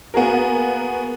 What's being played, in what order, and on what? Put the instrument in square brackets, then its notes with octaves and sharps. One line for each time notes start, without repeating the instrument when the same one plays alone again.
[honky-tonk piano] A#3 B3 F#4 G#4 A#4